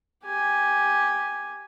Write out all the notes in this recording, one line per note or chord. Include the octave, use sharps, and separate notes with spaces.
G4 G#5